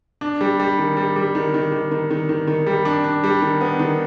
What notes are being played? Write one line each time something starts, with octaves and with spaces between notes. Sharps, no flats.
D4
G3
G3
D#3
G3
G3
D#3
D#3
D#3
D#3
D#3
D#3
D#3
G3
D4
D4
G3
D#3
B3
D#3